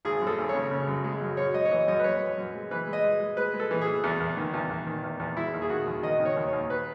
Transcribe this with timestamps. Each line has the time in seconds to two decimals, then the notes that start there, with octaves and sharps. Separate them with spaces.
0.05 G#1 G#4
0.21 F#2
0.27 A4
0.38 G#1
0.49 C#5
0.55 C#3
0.71 C#3
0.88 F#2
1.04 G#3
1.21 F#2
1.37 F#2 C#5
1.54 G#3 D#5
1.65 C#5
1.71 E3 D#5
1.87 F#2 D#5
1.99 B4
2.04 F#2 C#5
2.21 F#2
2.38 F#2
2.54 G#3
2.71 E3 B4
2.87 G#3
2.93 D#5
3.04 G#3
3.20 G#3
3.37 G#3 B4
3.54 G#3
3.60 A4
3.71 E3
3.81 G#4
3.87 E3
4.04 E2
4.20 E2
4.37 D#3
4.54 E2
4.70 E2
4.86 D#3
5.04 E2
5.20 E2
5.36 G#3 E4
5.53 D#2
5.61 G#4
5.70 D#3 F#4
5.87 D#2
6.03 D#3 D#5
6.20 D#3
6.25 C#5
6.36 D#2
6.47 C#5
6.53 D#2
6.70 B4